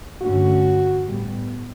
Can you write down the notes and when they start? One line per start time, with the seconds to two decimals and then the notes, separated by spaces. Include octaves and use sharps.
0.22 G2 D3 A3 C#4 F#4
1.03 A2 G3 B3